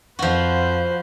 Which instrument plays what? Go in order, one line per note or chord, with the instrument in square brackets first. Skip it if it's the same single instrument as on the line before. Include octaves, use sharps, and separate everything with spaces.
[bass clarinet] F2 [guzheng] F3 F#4 [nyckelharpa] B4 C5